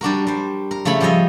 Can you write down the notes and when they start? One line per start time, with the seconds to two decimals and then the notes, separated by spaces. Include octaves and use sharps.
0.01 G3 D4 F#4 A#4
0.27 G3 C5
0.71 A#4
0.85 C#3 A3 E4 C#5 B5 C6
1.00 F3 G3 G#4 C#5 D#5 E5